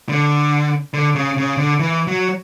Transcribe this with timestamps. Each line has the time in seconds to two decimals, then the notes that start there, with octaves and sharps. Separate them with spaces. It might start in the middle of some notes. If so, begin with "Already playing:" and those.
0.09 D3
0.93 D3
1.15 C#3
1.37 C#3
1.57 D3
1.79 E3
2.07 F#3